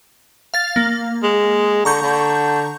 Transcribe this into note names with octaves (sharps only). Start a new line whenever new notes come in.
F5 A6
A#3
G#3
D3 A#5 C#6 G6
D3